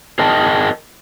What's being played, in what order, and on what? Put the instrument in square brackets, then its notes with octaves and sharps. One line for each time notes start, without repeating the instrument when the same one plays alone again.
[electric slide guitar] G#4 A#4 D#5 G5 A5